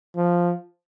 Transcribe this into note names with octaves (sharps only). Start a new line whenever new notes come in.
F3